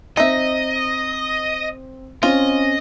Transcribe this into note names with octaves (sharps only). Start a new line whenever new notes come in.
C4 D#4 D#5 E5 A#6
C4 C#4 F4 D#5